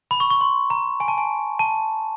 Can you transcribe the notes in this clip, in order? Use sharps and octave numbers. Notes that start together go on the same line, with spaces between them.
B5
C#6
C#6
C6
A#5
G#5
A5
G#5
A5